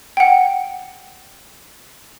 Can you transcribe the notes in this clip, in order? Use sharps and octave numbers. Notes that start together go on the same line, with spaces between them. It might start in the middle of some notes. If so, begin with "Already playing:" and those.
F#5 G5